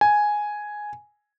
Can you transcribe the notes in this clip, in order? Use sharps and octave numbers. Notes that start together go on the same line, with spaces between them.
G#5